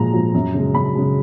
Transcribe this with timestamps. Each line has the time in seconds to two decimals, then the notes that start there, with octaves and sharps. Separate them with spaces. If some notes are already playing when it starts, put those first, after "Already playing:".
Already playing: A#2 F3 G#3 A#5
0.13 F3 G#3
0.34 F#2
0.54 C#3 G#3
0.74 F#2 B5
0.95 C#3 G#3